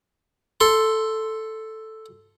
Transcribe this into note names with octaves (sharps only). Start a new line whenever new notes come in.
A4 C6